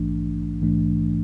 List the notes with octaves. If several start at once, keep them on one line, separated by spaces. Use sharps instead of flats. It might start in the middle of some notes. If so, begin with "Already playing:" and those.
Already playing: A#1 G#2 E3 A3 D4
A#1 G#2 E3 A3 D4